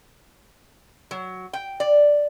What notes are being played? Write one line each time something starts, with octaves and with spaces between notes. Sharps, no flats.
F#3
G5
D5